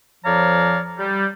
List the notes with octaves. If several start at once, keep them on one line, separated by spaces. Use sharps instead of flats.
F2 F3 C#5 D5 F5 A#5
G3